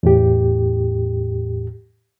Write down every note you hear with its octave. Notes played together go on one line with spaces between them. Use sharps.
E2 A2 G4